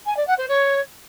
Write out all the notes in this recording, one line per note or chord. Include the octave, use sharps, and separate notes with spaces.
G#5
D5
F#5
C5
C#5